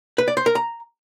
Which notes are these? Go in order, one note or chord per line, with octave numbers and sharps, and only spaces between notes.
B4
D5
C5
A#4
A#5